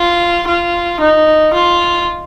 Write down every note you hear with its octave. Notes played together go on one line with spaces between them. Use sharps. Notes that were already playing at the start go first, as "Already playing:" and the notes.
Already playing: F4
F4
D#4
F4